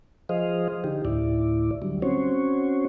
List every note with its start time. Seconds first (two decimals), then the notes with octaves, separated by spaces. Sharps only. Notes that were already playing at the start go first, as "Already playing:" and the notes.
0.29 F3 G#4 C5 D#5 F5
0.84 D3 D#4 G4
1.05 D2 A2 E4 D5
1.82 D3 F#3 G3
2.02 C4 C#4 F#4 C5 C#5